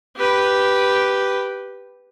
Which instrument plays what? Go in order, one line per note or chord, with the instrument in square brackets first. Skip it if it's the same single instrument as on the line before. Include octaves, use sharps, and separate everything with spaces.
[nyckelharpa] G4 B4